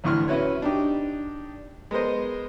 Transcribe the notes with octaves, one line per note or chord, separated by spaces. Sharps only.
A1 D2 A2 C#6 F6
C#4 E4 F#4 B4 C#5
D4 D#4 G4
G#3 B3 A#4 C5 D#5